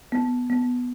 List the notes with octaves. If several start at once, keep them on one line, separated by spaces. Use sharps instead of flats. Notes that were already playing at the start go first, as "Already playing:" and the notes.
B3
B3